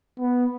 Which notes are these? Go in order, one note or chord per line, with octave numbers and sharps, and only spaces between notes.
B3